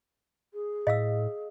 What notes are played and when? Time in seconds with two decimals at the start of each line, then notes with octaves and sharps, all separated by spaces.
0.54 G#4
0.87 A2 D#5 F5 E6